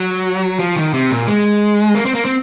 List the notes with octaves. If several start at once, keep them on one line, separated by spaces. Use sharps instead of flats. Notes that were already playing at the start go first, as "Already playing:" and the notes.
Already playing: F#3
F3
D#3
C3
A#2
G#3
A#3
C4
A#3
C4